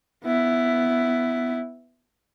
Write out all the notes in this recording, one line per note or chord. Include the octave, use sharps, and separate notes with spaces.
B3 E4